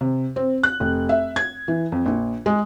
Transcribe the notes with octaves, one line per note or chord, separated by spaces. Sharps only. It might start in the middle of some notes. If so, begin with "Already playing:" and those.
C3
C4
F#6
F1
E5
G#6
E3
F2
A#1
G#3